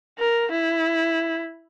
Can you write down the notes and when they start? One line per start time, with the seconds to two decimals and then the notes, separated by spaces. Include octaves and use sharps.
0.18 A#4
0.52 E4